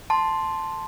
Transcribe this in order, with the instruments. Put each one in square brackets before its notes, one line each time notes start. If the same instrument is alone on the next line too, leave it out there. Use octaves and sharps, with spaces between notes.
[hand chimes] A5 C6